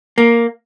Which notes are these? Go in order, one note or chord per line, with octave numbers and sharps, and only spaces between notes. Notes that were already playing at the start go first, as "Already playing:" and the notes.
A#3